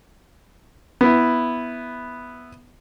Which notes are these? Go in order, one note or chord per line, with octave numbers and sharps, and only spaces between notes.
B3 E4